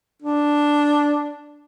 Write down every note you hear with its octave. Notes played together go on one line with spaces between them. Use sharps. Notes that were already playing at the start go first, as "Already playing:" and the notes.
D4